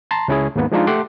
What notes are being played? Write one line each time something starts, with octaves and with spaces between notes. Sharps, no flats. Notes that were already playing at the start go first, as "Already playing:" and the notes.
A5 A#5 C6
C#2 C#4 E4 G#4
D#2 G#2 A#3 B3
F3 G#3 D4 D#4 F4
A3 G4 F#5 C6 D6